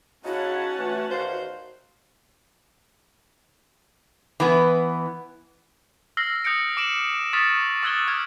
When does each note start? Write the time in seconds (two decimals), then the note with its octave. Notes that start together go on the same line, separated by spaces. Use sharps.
0.25 C#3 C#4 D#4 E4 F#4 F#5 A5
0.78 E3 A3
1.11 E2 D#3 C5 F5
4.40 E3 B3
6.17 E6 F6 A#6 C7 G7
6.44 D#6 G6 A#6 C#7 D7
6.77 D6 D7 E7 F#7
7.33 C#6 D#6 F6 A6 B6
7.83 C#6 E6 F#6 G#6 A6 G7
8.08 D#6 F6 G#6